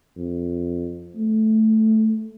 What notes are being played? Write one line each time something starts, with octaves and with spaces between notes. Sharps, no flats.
F2
A3